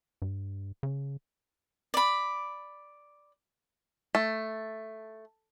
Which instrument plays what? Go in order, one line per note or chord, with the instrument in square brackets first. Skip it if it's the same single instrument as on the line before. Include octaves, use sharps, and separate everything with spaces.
[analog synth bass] G2
C#3
[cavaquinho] D5 B5
[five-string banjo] A3